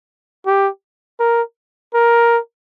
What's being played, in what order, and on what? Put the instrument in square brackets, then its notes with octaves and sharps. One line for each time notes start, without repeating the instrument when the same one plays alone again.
[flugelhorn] G4
A#4
A#4